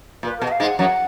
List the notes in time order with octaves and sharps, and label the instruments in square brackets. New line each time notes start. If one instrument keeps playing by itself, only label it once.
[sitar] A#2 [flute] B4
[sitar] B2 [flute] A#4
[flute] D#5
F5
[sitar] G#2 G#3
[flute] F#5
[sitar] F#2 F#3 [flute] F#5